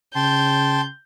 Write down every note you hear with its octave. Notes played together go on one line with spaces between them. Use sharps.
C#3 G5 A5 C6 G6